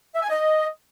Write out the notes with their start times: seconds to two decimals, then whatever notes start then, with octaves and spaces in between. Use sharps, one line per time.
0.15 E5
0.23 G#5
0.30 D#5